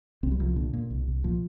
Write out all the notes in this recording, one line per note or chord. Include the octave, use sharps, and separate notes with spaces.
C2 C4
G3
C2 F3
A#2 D3
A#2
C2
C2
A#2 F3